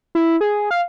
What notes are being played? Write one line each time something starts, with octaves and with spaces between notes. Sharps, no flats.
E4
G#4
F5